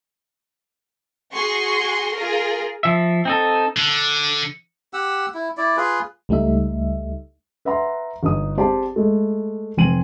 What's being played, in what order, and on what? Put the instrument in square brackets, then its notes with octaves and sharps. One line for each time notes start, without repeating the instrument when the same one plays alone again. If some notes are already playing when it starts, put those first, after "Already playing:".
[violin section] F#4 G#4 C6 C#6
F4 G#4 A#4
[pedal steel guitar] F3 E5
C4 D#4 A4
[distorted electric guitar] D3
[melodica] G4 F#5 E6
E4
E4 D5
F4 G#4 B4
[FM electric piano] C#2 G3 A3 D#4 E5
[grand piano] B4 E5 F#5 A#5 C6
G1 D#4 D#6
C4 G4 G#4 C5 D5 A5
G#3 A3
F1 C4 G#5 D#7 F#7